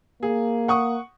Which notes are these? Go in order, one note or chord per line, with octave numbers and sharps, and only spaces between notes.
A#3 G#4
F#5 C#6 D#6